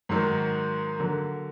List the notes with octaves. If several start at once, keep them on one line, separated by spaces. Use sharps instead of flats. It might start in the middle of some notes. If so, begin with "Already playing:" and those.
G#2 D#3 F#3
D3 F#3 A#3